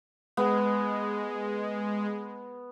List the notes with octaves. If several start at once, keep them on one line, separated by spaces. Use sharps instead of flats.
G#3 B3